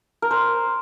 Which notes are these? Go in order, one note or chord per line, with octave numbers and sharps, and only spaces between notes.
A#4
C5